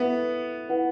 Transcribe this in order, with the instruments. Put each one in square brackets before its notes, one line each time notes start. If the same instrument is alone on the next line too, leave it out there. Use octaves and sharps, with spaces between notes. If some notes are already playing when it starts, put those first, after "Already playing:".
Already playing: [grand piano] B3 [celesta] E4 A4 E5
[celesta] E4 B4 F#5